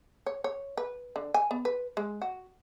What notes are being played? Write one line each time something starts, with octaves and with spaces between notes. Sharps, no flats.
C#5
C#5
B4
D3
G#5
B3
B4
G#3
F#4